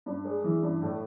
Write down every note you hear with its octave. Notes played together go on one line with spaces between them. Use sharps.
G2
G#3
E3
G2
A2